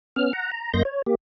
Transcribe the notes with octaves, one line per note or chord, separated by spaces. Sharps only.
B3 C#4 F6
F#5 A#5
A#5
F#2 A#3 D#5 C6 G6 A#6
C#5
A#3 G4